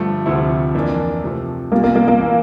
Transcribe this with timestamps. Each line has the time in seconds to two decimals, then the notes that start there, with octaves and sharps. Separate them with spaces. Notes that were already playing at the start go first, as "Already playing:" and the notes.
Already playing: G2 D3 F3 A3
0.26 D2 C3 F3 A3 E4
0.74 F2 E3 A#3 D4
1.23 C3 F3 A3
1.72 C2 A#2 G3 A#3
1.84 A#3
1.96 A#3
2.08 A#3
2.20 E3 A3